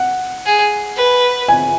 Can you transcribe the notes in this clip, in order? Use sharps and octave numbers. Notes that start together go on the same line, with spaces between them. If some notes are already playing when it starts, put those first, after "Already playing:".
Already playing: F#5
G#4
B4
G#5